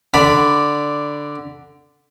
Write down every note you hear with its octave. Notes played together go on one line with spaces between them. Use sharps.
D3 D5 B5